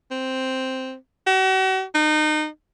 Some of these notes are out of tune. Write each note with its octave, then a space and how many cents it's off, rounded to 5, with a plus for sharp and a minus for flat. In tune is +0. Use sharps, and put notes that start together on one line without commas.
C4 +0
F#4 +40
D#4 -25